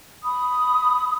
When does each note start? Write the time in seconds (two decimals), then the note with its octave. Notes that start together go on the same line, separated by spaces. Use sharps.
0.23 B5 D#6